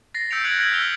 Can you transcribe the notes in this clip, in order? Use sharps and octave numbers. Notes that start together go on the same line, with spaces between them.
A6 A#6 C7
E6 G6 B6 C#7 D7 F7
F#6 G#6 C#7 D#7 F#7
F6 G6 G#6 B6 F#7
E6 F6 B6 F7 G7